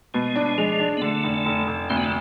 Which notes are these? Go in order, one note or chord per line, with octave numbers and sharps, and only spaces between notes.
B2 G#3
D4
G#3
F3 G#3
D4
B3
D3 A3
F1
F1
F1
D2 C4
B3
A3